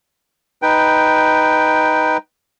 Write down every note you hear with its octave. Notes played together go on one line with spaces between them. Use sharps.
D#4 B4 G5